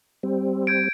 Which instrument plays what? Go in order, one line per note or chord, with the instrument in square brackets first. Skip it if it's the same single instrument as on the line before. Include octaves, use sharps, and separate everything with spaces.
[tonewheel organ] G3 C4
[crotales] G6 G#6 D7